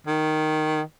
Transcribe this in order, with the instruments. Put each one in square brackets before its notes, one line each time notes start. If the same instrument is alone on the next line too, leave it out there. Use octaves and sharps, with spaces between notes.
[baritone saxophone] D#3